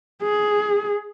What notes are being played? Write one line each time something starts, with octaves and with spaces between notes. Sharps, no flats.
G#4